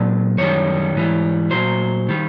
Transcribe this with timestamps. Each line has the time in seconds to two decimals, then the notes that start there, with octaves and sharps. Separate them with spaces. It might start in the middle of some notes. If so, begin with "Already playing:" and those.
Already playing: A#2 F#3 D5
0.38 F#2 D#3 G3 C#5
0.95 G#2 E3 G3
1.51 A#2 F#3 C5
2.09 D#3 G3